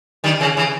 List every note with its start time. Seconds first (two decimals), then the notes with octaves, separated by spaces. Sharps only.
0.24 D#3 G3
0.40 C#3 E3
0.57 C#3 E3